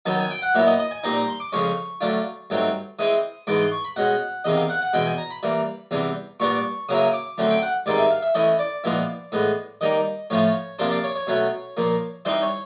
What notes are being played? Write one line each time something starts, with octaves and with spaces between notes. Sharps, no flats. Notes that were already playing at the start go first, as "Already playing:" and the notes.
F#2 D#3 F#3 B3 D#4 A5
G#5
G5
F#5
A#2 F#3 B3 E4 E5
D#5
D#5
G#5
A#2 G3 C4 D#4 A#5
A#5
C6
D6
F2 C#3 F3 G#3 C#4 C#6
D3 F#3 A3 D4 F4
G2 D#3 F#3 A3 C4
E3 G#3 C4 E4 D#6
G#2 E3 G#3 B3 D6
C6
C#6
B5
B2 G#3 C#4 F#5
E2 C3 D#3 D#5
F5
F#5
F#5
E2 B2 G#3 G5
G#5
A#5
B5
E3 G3 A#3
E2 C3 E3 G3
A#2 G3 B3 D4 C#6
C#3 F#3 A#3 C#4 E4 D#6
D6
F#2 D3 F#3 A3 C4
G5
F#5
G2 D#3 G#3 C4 D#4 D5
E5
F5
E5
E3 A3 C#4 E4 D#5
D5
A#2 F3 G#3 B3 E4
A2 E3 G#3 B3
D#3 G3 A#3 D#4 D#5
A2 F3 A3 C#4 F4 C#5
C3 F3 A#3 D4 F4 C5
D5
C#5
C#5
B2 F#3 A3 C#4
A#2 F3 A#3
E3 G3 C4 D#4 C5
C#5